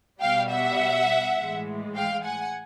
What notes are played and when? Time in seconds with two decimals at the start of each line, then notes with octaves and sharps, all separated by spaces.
0.21 B2 G3 F5 G5
0.50 E5 F#5
1.37 A2 E3 G#3
1.96 F5 G5
2.25 F#5 G#5